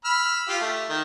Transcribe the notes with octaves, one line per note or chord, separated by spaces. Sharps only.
B5 E6 F6
F4 G4 F5
A3
D#3